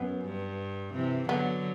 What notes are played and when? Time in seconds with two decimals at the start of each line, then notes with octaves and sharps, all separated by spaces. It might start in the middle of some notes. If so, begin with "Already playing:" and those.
Already playing: F#2 B3
0.25 G2
0.94 C3 E3
1.28 D3 F#3 B3